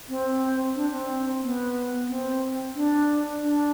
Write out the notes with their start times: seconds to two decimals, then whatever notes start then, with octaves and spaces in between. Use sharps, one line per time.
0.09 C4
0.75 D4
0.92 C4
1.42 B3
2.09 C4
2.75 D4
3.42 D4